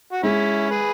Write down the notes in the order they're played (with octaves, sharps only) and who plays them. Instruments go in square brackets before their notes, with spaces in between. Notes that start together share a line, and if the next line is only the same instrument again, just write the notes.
[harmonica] F#4
[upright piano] G#3 [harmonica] C#4 E4
[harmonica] G#4 B4